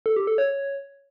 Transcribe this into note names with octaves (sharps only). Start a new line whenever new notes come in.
A4
G4
A4
C#5